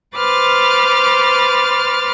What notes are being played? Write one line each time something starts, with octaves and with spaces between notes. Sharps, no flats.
B4 C5 D6 F6 A6